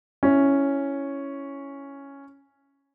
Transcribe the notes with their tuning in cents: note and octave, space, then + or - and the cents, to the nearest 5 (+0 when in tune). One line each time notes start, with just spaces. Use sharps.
C#4 +0 E4 +0